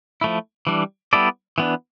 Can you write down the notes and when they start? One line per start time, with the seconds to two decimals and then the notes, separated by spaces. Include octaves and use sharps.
0.21 F3 A3 E4
0.67 E3 G3 D4
1.13 G3 B3 E4 A4 D5
1.58 E3 B3 D4